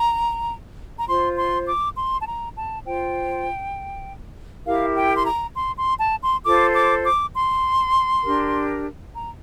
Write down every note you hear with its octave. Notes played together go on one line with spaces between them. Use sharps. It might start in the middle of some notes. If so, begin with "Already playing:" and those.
Already playing: A#5
A#5
F4 C5 C6
C6
D6
C6
A5
A#5
A5
F4 C5 G5
E4 G4 A#4 F5
G5
C6
A#5
C6
C6
A5
C6
F4 A4 C5 D6
D6
D6
C6
D4 G4 A#4
A#5